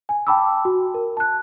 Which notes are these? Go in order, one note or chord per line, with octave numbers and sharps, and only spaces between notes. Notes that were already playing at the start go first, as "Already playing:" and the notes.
G#5
G5 A5 B5 D6 E6
F#4
A#4
A5 F#6